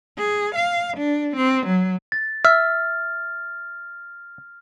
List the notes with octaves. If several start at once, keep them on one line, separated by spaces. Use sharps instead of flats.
G#4
F5
D4
C4
F#3
A6
E5 F6